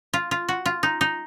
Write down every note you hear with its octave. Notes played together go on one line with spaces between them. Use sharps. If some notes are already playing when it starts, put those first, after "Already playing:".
F4
F4
F#4
F4
D#4
D#4